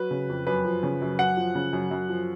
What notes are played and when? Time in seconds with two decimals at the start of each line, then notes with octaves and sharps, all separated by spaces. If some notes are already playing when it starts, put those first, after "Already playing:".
Already playing: F#3 B4
0.11 C#3
0.29 F2
0.47 F#2 B4
0.65 F3
0.83 C#3
1.02 F#2
1.19 F#2 F#5
1.37 F3
1.55 C#3
1.73 F#2
1.91 F#2
2.09 F3